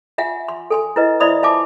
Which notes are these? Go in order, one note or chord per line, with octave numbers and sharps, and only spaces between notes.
F4 E5 F#5 G#5
C6
A4 G#5 C6
E4 B4 D#5
E4 C5 D5 E5 B5 D#6
F4 E5 G#5 A5 D6